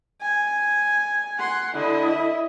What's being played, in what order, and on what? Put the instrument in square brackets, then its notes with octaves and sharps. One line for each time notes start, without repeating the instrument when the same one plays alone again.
[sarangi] G#5
[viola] F#5 C6
[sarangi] D3 [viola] E4 D#5
[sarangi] E5